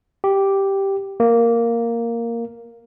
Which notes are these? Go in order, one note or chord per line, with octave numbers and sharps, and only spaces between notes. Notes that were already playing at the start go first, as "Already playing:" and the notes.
G4
A#3